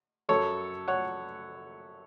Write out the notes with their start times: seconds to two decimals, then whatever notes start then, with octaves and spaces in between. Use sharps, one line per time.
0.29 F#2 F#3 A4 C#5
0.88 C#5 F#5